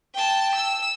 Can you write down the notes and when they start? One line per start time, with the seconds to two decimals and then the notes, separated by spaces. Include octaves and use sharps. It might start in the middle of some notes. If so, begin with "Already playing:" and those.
0.14 G5 A5
0.55 E6